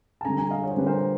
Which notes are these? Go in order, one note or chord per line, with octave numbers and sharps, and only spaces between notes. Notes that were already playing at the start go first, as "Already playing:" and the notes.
A5
D3 G3 G#5 A#5
G#5 A#5
D#5 F5
C#5
C5
D3 G3 B4
A#4 C5